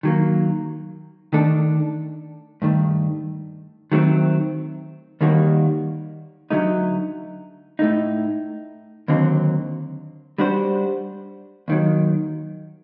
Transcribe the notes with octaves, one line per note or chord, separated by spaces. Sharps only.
D#3 F#3 A#3
D#3 A3 D4 A4
G2 D#3 A3
D#3 F#3 A3 C4
D#2 D#3 G3 A#3 F#4
D2 D3 F#3 A3 D#4
A2 A3 D#4
D#2 D3 F#3 C4
G3 D4 F#4 C5
D#2 D#3 F#3